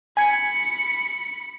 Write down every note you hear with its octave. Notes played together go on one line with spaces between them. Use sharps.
G#5 B5 G#6 C#7